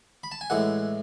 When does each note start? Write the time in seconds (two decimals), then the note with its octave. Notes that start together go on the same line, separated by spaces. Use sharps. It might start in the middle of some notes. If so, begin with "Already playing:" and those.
0.23 B5
0.32 A5
0.41 G#5
0.50 A2 E3 G#3 F#5